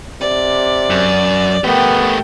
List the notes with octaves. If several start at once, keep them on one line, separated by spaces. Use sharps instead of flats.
C3 D5
F#2
A3 B3 G4 A#4 G5